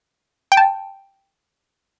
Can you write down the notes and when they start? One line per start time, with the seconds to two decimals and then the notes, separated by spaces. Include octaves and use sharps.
0.52 G5
0.57 A5